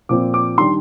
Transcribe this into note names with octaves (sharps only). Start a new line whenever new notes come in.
A#2 F3 C4 D6
D6
D#3 G3 D4 C6